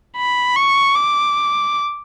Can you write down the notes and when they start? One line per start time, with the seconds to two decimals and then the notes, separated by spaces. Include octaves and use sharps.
0.17 B5
0.57 C#6
0.96 D6